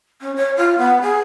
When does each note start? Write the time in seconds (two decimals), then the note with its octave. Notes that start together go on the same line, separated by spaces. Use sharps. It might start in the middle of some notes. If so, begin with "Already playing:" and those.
0.21 C#4
0.36 C#5
0.57 F4
0.78 B3
1.01 G#4